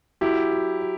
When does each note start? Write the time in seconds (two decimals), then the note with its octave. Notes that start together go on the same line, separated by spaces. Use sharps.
0.21 F#3 E4 G4
0.51 F#3
0.81 F#3